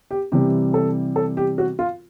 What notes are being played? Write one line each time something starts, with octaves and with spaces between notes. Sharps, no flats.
G4
C3 E3 G3 G4
A4
A4
G4
F#4
F4